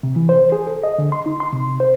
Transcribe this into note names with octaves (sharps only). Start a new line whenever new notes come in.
C3
E3
C5
G#4
A4
D#5
D3
C6
D#4
C6
C3
C5